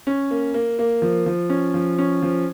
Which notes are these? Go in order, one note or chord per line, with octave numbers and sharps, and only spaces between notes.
C#4
A#3
A#3
A#3
F3
F3
C#4
F3
C#4
F3